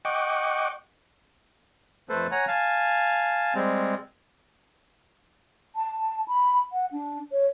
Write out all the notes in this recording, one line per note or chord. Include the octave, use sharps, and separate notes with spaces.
D#5 F#5 G5 C#6 D6
F2 A3 A4 B4 C5
C#5 F#5 G#5 A#5
F5 G#5 A5
G3 G#3 C4
A5
B5
F#5
D4
C#5